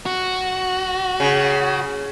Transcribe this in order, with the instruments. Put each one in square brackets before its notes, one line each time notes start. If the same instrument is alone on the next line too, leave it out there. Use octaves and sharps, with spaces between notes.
[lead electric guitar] F#4
[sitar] C#3